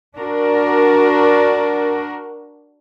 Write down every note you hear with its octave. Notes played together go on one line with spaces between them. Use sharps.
D4 F#4 A#4